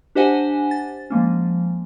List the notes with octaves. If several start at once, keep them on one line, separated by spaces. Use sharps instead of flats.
D4 G4 C5 D#5 F#5 G#5
A6
F3 G#3 A#3 C#4